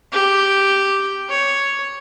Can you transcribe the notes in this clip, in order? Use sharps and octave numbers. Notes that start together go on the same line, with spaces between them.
G4
C#5